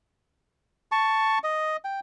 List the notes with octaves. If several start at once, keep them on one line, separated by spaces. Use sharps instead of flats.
A5 C#6
D#5
G5